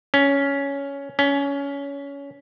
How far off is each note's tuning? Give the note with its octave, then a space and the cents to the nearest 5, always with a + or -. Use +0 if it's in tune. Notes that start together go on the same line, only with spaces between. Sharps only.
C#4 +10
C#4 +20